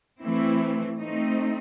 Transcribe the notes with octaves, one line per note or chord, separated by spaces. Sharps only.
E3 A3 C4 E4
A3 C4 D#4